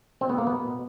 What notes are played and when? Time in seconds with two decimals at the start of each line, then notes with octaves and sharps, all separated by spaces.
0.21 B2 C4
0.29 B3
0.37 B2 A#3
0.47 B3
0.52 B2
0.68 B2